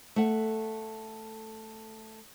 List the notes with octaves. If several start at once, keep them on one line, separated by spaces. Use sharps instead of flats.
A3 F#5